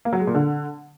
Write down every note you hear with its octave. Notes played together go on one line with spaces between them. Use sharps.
A#3
F#3
G#3
A#2
D3